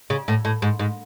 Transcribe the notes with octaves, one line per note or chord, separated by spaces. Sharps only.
C#3
A2
A2
G#2
G#2